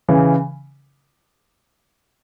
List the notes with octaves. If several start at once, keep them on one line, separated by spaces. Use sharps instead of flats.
C#3 E3